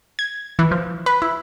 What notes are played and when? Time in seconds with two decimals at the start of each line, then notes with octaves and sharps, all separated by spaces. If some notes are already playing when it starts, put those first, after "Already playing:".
0.19 G#6
0.59 E3
0.71 F3
1.06 B4
1.22 E4